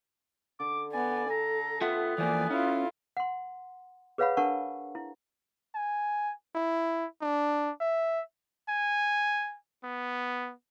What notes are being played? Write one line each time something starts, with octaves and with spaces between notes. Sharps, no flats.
D3 D6
B3 D5 G#5
A4 A#5
B3 F4 E5 F#5 G5
E3 F3 A#3 D5 G#5
C#4 E4 F4
F#5 C6
G#4 B4 C#5 F5 F#5 B5
D4 A#4 F#5 A5 C#6
E4
G#5
E4
D4
E5
G#5
B3